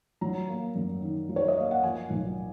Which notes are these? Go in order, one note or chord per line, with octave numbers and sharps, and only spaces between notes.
F#3 A#5
A#3
F#2
D#3
F#3
C#5
D#5
A#3 F5
F#5
F3 G#5
B1